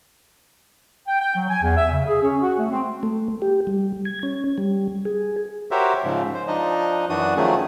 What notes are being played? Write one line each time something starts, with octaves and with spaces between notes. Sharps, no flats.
G5
G5
F#3
G#5
E2
E5
C#3
G#4
C#4
F#4
A3
C4
A3
G4
G3
G#6
C#4
G3
G#4
F#4 G4 A#4 C5 C#5 E5
G#2 C#3 F3
C5
F3 D4 D#4 D#5
F#2 E3 D4 F#4 D#6
D#3 F3 F#3 A3 C#4 G#4